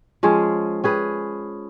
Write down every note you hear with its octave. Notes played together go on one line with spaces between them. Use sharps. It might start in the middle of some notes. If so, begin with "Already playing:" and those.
F3 G#3 C#4 G#4
C#4 G#4 B4